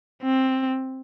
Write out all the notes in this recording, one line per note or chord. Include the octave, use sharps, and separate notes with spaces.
C4